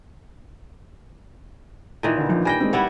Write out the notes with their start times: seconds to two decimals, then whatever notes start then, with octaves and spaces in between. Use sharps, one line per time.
2.03 A#2 D#3 E3
2.17 D3 E4
2.29 A#1
2.45 G3 G5 G#5 A#6
2.60 G#3 C4
2.73 G3 E4 C#5 F#5